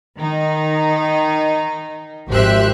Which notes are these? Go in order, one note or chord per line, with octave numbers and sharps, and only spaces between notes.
D#3 D#4
G#1 F3 G4 C5 E5 F#6